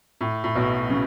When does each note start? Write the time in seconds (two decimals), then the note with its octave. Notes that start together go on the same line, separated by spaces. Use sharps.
0.21 A2
0.44 A2
0.55 B1 B2
0.90 C#3